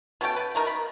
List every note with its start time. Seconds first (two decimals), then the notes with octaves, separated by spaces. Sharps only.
0.21 B2 C#4 A4 G5
0.36 B4
0.55 A3 D#4 A#4
0.67 B5